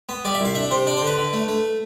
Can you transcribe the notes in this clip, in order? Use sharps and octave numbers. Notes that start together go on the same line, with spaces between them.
B3
G3 D5
E5
C2
F5
D4 E5
C3 C5
D4 D5
C5
D3
B4
D3
A3
A3